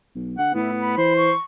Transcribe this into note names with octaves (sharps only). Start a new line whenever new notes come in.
B1
D3 F#5
A2 B3 E4
B5
E3 C5
C#6